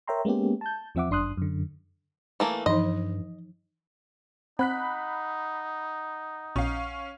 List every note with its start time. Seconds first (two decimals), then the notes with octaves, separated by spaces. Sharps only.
0.07 A#4 C#5 E5 G5 A#5 C6
0.25 G#3 A#3 B3 C#4 G4
0.61 A5 G6
0.95 E2 F3 C4 E5 F#5 D6
1.09 G1 F#2 D4 C6 D#6 F#6
1.37 F#2 D3
2.40 E3 A3 A#3
2.66 G2 E3 F3 D#4 D#5
4.59 C4 D#4 F#5 B5 F#6 B6
6.56 A#1 C#4 F5